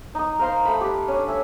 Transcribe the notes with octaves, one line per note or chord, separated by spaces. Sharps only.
D#4 D#6
A#4 C5 F5 C6
A3 B5
G4 B4
C#4 D4
A3 E5 G#5